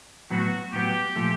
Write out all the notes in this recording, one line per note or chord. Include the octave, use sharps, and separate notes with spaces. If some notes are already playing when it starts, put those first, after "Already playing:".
A2 F#3 B3 F#4
A2 F#3 B3 G4
A#2 F3 A3